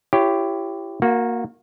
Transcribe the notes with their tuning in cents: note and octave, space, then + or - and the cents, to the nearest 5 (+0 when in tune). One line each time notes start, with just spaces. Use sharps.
E4 +35 G4 +0 C#5 +0
A#3 +0 F#4 -25